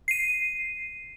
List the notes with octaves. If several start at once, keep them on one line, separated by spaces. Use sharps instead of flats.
C7 D#7